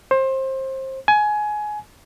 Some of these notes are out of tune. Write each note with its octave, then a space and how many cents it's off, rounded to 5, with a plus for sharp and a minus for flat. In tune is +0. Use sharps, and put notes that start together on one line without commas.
C5 +25
G#5 +20